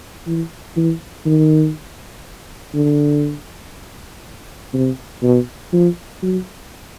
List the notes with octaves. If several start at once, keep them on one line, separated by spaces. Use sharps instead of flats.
E3
E3
D#3
D3
C3
B2
F3
F#3